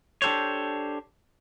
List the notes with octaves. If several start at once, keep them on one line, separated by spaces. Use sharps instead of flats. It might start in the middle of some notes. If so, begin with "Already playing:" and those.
D4 G4 A4 C5 C#5